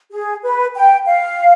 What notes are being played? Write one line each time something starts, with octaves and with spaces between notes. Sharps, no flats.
G#4
B4
G5
F5